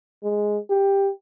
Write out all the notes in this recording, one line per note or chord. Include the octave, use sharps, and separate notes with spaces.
G#3
G4